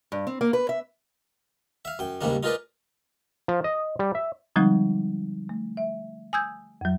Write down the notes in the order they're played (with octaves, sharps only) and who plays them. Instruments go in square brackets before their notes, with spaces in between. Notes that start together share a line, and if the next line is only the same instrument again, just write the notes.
[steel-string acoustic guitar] G2
C4
A#3
B4
E5
[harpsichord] E5 F5
F#2 G5
D#2 G#2 C#3 G3 A#3 D4
D#4 F4 G#4 A#4 B4 D5
[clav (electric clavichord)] F3
D#5
G3
E5
[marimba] D3 F3 G3 G#3 C4 D#4
A3
E5
G#5 D#6 E6 G6 G#6
F2 F#3